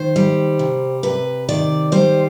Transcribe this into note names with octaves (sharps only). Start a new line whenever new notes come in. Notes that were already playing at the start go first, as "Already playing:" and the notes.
Already playing: D#3 C5
G3
C3
C3 B4
D#3 D5
G3 C5